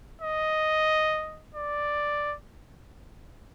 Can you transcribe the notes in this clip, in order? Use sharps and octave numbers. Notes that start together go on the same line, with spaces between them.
D#5
D5